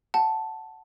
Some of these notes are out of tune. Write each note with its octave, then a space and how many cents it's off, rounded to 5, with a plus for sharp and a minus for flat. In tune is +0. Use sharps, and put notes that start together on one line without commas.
F#5 +10 A5 +0